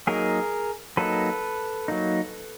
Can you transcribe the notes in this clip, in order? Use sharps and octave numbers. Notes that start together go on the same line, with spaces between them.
F#3 A#3 D#4 G#4 A#4
F#3 A#3 D#4 A4 B4
F#3 A#3 D#4